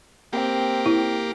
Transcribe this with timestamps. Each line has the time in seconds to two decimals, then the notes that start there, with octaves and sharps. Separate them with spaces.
0.33 A#3 C4 G4
0.86 E4